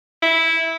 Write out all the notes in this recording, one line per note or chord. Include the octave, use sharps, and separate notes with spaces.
E4